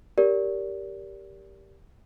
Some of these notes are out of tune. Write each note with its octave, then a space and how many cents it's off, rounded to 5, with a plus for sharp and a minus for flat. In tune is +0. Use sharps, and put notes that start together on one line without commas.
G4 +0 A#4 +0 D5 -30